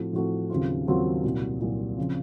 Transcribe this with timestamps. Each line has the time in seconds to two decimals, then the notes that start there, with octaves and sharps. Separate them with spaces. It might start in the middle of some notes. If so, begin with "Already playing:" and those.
Already playing: A2 F3 C4 F#4 A4
0.13 A2 F3 C4 F#4 A4
0.50 D#2 C#3 F#3 C4 F4
0.87 D#2 C#3 F#3 C4 F4
1.24 C2 A#2 F#3
1.61 C2 A#2 F#3
1.98 C#3 F3 C4